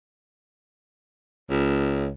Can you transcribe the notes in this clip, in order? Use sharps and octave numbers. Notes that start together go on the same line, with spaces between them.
C#2